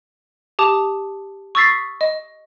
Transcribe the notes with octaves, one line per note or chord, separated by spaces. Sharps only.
G4 A5 D6 D#6
C#6 D#6 E6 A6 B6 C7
D#5